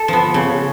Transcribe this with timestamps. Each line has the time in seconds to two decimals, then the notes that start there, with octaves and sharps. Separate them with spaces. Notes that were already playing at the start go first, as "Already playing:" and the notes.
Already playing: A4
0.08 F3 B3
0.34 C#3